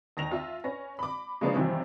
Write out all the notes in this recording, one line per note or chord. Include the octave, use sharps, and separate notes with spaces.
D#2 A#6 F7
F4 E5
C#4 B4 A#6
B5 D6
C#3 F3 G#3 A#3 D4 B4
G2 C3 D#3 E3 F#3